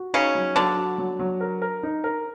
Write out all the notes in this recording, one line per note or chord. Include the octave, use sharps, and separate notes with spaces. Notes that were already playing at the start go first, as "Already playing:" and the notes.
Already playing: F#4
C#3 C#4 D#4
F#3
D3 F#3 D4
F#4
F#3
F#3
A#4
A#4
D#4
A#4